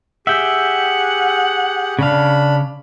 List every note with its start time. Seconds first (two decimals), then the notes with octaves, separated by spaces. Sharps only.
0.27 G4 G#4 E5 F#5 G5
1.99 C#3 D4 F5 B5